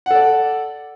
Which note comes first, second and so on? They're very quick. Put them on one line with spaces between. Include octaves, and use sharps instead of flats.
F#5 A4 D5